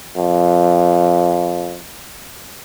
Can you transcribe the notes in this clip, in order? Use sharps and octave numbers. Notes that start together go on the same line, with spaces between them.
F2